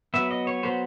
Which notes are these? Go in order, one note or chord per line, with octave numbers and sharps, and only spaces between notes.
F#3 B3 E5
D#5
C#5
F#3 B3 C5